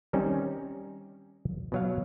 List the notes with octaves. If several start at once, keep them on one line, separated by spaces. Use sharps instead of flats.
D#3 G3 C4 C#4 D#4
B2 F#3 F5